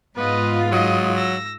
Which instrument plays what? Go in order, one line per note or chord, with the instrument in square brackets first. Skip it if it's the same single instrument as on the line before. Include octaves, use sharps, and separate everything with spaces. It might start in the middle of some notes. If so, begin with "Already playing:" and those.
[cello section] G#2 G#3 F4 [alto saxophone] B3 [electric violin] B4 D#5
[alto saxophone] F#3 [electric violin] D#5 D#6
[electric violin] E6 A#6